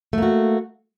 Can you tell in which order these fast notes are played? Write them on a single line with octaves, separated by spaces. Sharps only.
A3 A#3 F#4